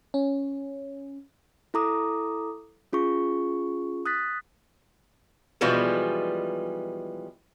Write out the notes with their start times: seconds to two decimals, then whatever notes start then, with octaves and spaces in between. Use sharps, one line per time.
0.14 C#4
1.74 E4 A4 A#5 D6 D#6
2.93 C#4 F4 G#4 C#6
4.06 D#6 F#6 A6 B6
5.61 B2 E3 F3 G3 G#3 B3